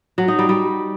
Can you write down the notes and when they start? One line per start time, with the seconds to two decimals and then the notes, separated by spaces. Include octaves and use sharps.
0.18 F#3
0.28 D#4
0.39 G3
0.49 G3